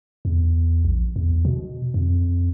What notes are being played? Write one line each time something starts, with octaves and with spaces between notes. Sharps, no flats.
E2
A#1
E2
B2
F2